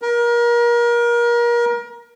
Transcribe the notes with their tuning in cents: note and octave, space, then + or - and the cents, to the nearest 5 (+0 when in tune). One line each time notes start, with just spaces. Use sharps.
A#4 +30